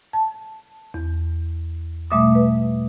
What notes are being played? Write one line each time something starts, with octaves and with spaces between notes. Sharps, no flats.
A5
E2
B2 G3 A3 E5 D6 D#6
B4